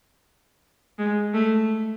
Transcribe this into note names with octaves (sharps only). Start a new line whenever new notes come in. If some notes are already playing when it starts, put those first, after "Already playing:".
G#3
A3